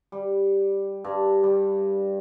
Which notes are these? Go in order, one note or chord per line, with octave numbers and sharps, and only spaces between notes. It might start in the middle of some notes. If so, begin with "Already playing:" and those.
G3
G2
G3